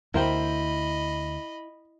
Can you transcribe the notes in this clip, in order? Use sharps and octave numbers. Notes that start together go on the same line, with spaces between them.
D2 E4 A#4 C5 D#5 G5 B5